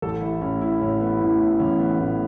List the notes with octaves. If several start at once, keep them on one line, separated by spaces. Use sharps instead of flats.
A1 A4
E4
A2 E3 C#4
E4
A1 C#4
B3
A2 E3 C#4
E4
A1 C#4
B3
A2 E3